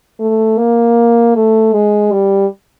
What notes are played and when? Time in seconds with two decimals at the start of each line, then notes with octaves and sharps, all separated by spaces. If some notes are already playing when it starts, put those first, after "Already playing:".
0.19 A3
0.58 A#3
1.35 A3
1.73 G#3
2.12 G3